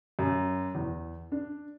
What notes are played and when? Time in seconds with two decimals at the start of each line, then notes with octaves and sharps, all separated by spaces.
0.19 F#2
0.75 E2
1.32 D4